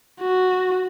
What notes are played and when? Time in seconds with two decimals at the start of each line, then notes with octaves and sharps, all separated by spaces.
0.20 F#4